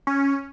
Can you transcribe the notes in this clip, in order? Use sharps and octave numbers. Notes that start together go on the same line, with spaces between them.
C#4